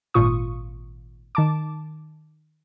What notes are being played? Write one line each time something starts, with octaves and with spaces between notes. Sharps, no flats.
G#1 A#2 F4 C#6 D#6
D#3 A5 D6